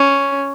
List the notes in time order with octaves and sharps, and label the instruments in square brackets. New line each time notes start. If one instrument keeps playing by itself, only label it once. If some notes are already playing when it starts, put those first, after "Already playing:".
Already playing: [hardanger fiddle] C#4